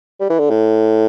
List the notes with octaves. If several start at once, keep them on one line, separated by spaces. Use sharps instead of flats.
G3
E3
D3
A2